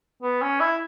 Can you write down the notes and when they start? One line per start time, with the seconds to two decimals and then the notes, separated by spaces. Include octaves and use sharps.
0.22 B3
0.42 C#4
0.61 E4